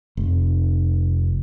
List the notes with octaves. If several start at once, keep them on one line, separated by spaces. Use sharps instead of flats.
F1